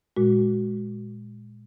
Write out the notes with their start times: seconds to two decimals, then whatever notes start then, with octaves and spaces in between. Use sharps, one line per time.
0.16 A#2 G#3 F#4